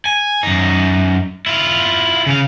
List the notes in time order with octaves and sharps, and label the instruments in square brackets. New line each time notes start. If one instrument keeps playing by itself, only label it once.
[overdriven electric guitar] G#5
F#2 D#4
E4 F4
C#3 F5